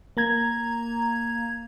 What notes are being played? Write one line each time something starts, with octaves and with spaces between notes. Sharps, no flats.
A#3 A#5 G#6